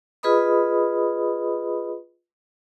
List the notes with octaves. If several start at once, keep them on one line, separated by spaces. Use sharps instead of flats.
F4 G#4 B4 D#5 B5 D#6